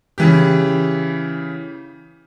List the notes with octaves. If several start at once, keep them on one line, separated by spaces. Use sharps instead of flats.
C#3 E3 G4